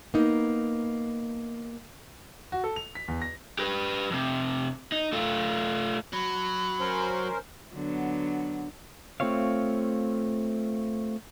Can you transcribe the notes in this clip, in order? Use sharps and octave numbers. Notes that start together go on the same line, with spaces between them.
A#3 B3 D#4
F#4
A4
F7
B6
E2
A#6
G4 B4
F2 C3
D#4
A3 F4
F#3 B5
C#4 A#4 C5
D3 F#3 B3
A3 C4 F4 C#5 F5